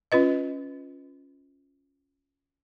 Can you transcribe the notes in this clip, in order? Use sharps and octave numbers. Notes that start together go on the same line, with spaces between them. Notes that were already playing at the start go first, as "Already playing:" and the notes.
C#4 F4 B4 D#5